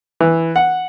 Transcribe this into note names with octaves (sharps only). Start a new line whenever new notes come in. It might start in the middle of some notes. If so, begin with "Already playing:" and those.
E3
F#5